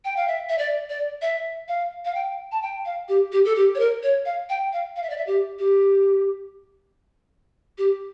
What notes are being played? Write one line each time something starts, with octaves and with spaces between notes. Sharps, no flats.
G5
F5
E5
E5
D5
D5
E5
F5
F5
G5
A5
G5
F5
G4
G4
A4
G4
C#5
A#4
C#5
F5
G5
F5
F5
E5
D5
E5
G4
G4
G4